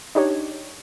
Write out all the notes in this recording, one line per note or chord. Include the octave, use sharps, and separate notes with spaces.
D4 D#4 G4 C#5